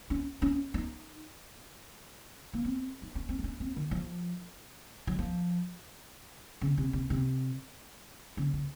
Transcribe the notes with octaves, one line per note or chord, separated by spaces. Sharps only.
C#4
C#4
D#4
A#3
C4
D#4
C#4
C4
D#4
C#4
C4
D#3
F3
F#3
F3
C#3
C3
C3
C3
C#3
C#3